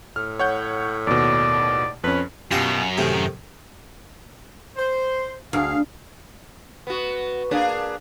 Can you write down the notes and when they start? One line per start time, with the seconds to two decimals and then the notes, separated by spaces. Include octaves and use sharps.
0.16 A2 F6
0.39 C#5 F#5 G6
1.07 D#2 B2 D5
2.04 F2 C#4 B4
2.51 F#2 B2 B3 F4 G4 A5
2.98 A2 C3 D#3 A3
4.77 C5
5.53 D2 G#4 F5
6.87 B3 F#4
7.51 A#3 D4 G#4